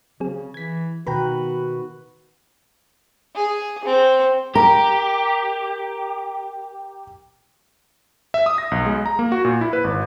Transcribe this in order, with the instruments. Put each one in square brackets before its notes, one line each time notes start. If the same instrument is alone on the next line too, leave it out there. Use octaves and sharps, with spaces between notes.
[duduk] C#3 [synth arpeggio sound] F#3 C4 G#4
[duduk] E3 [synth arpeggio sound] G#6 B6
[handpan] B2 D#3 B4 [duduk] F#4 [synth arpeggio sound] G5 A#5 B5
[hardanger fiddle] G#4
C4
[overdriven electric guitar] G4 [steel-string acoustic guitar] A#4 [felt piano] A#5
[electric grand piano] E5
D#6
A#6
B1
G#3
A#5
A#3
F#4
A#2
E4
B4
G#1